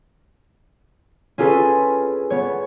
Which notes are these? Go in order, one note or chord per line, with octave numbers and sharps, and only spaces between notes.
C#4 F4 G#4 A4 B4
B3 C#5